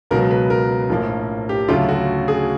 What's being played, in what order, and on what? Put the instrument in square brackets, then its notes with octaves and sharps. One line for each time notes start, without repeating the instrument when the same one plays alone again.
[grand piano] C#2 B2 F#3 A#4
B4
A#4
A#1 A2 F3 A#3
G4
D2 C#3 F#3 A3 F4
F#4
G#4